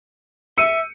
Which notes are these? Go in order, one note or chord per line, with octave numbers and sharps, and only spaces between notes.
E5 E6 C#7 D#7